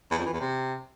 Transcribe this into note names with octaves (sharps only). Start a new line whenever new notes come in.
E2
F2
E3
E2
C3